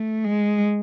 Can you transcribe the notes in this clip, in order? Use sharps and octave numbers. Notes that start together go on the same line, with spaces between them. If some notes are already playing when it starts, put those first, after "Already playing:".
Already playing: A3
G#3